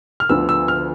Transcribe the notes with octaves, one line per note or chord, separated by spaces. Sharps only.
F6
D2 D3 F3 B3 E6
E6
F6